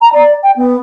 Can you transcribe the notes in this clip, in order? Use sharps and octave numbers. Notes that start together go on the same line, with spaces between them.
A#5
D5
G5
B3